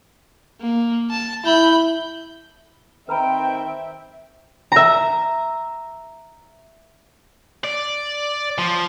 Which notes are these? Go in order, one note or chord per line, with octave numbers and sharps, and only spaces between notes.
A#3
A5
E4 B5 G6
D#3 C4 B4 E5 G5 A#5 B5
E5 A#5
D5
F3